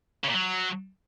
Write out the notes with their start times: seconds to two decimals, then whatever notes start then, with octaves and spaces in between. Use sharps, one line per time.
0.24 C#3
0.29 A#2
0.34 F#3